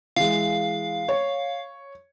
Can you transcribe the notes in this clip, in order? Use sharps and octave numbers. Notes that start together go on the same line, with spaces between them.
E3 G#3 F5
C#5